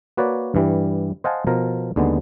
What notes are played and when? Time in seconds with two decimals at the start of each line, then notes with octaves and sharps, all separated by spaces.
0.17 A#3 F#4 B4 C#5 D5
0.55 G2 E3 G3
1.24 C5 D#5 F5 F#5 G#5 A5
1.47 B2 F3 A#4
1.96 D#2 D3 G#3 B3